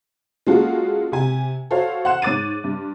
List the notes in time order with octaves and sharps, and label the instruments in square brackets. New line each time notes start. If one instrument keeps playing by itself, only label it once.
[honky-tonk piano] G#3 A#3 C#4 F4 F#4 A4
C3 G#5
F#4 A4 C5 C#5 F5
F#5 C6 F#6 E7
G#2 C#5 D6 A6 D#7
G2